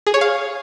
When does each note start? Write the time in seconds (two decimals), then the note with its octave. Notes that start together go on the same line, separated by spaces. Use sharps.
0.07 G#4
0.14 C#5
0.21 F5